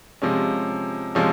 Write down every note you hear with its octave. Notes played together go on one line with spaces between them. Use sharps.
C3 F3 G#3 C#4
C3 F3 G#3 C#4